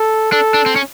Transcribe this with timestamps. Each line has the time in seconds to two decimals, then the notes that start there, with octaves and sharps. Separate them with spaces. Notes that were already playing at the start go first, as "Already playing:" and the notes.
Already playing: A4
0.32 D4 A4
0.54 D4
0.66 C4
0.76 C#4